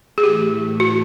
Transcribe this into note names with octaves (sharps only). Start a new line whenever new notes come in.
G#4
A2 E3 A3 G4
F#4